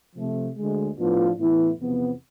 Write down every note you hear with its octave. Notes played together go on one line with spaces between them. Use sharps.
C3 F3 A3
D2 D3 G#3
A2 F3 B3 D4 F4
A2 E3 B3 E4
E2 C3 F3 B3